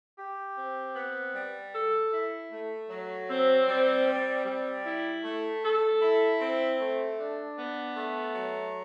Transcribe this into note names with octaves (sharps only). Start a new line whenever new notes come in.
G4
C4
B3
G3
A4
E4
A3
F#3
C4
G3
C4
G3
E4
A3
A4
E4
C4
A3
D4
B3
A3
F#3